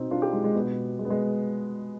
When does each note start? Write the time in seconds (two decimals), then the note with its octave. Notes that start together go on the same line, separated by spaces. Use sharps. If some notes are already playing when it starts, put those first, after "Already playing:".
Already playing: B2 C4 D#4
0.11 D4 F4
0.22 D#4 G4
0.33 G#3
0.44 G#3
0.55 B2 B3
0.99 G#3
1.05 B3
1.10 G#3